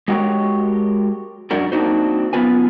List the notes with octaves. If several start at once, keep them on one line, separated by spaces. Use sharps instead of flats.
G#3 F#4 G4 A#4 C#5
F#2 D4 F#4 A#4
A#3 C4 D4 D#4 F#4 C5
F#2 E3 B3 F4 B4 G#5